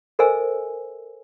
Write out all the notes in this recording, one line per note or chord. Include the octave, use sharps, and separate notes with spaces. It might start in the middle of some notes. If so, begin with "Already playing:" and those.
A4 A#4 C5 D#5 G#5 E6